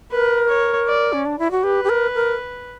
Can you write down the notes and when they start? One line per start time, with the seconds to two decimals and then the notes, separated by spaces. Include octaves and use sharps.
0.11 A#4 B4
0.49 C#5
0.88 D5
1.13 C#4
1.25 D4
1.39 E4
1.51 F#4
1.63 G4 B4
1.84 G4
1.89 A#4
2.15 A#4